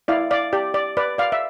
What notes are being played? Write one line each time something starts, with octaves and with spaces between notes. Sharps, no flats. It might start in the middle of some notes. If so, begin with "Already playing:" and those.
E4 D5 F5
D5 F5
G4 D5
D5
B4 D5
D5 F5
E5